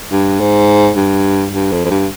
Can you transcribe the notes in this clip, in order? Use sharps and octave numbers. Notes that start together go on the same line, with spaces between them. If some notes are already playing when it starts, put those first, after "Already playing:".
G2
G#2
G2
G2
F2
F2
G2